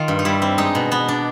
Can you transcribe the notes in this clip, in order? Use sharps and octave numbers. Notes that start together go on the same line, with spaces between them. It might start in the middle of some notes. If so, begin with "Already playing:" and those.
Already playing: D#3 F4
G2
D#4
G3 E4
C4
G#3 D#4
B2
B3
D4